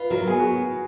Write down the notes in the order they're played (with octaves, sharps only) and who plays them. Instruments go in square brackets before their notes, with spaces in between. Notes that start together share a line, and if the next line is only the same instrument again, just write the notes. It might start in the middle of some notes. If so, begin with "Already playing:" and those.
Already playing: [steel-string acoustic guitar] F4 [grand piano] B4
[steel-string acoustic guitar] F#3 [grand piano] A#4
[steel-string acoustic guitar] B3 [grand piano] G#4
[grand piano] F#4